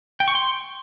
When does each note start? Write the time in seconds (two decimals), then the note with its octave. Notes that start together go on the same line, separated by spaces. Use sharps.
0.20 G5
0.28 C#6
0.35 C6